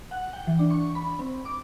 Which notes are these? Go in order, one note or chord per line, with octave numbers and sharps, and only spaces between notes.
F#5
G5
E3
D4
C#6
B5
C4
D6